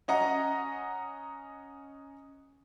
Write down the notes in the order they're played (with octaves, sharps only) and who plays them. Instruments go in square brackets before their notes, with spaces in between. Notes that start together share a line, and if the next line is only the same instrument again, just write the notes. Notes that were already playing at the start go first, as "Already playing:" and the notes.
[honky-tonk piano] C#4 D#5 F#5 A#5